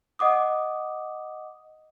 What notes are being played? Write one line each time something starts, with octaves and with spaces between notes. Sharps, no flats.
D#5 F#5 D6 D#6